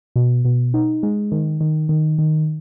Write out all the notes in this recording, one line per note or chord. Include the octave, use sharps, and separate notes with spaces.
B2
B2
D#4
G#3
D#3
D#3
D#3
D#3